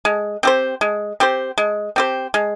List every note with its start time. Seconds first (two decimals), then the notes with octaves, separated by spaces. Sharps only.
0.05 G#3
0.43 C4 G4 C5
0.81 G#3
1.20 C4 G4 C5
1.58 G#3
1.96 C4 G4 C5
2.34 G#3